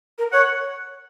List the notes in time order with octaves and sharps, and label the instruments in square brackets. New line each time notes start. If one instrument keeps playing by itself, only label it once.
[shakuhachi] A#4
[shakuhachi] C#5 [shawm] F#5